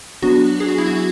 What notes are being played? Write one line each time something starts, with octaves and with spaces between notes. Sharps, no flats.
F#3 B3 D4 F#4
G#4
F#4
E4
F#4